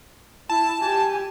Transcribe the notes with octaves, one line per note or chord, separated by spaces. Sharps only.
E4 A5
G4 G#5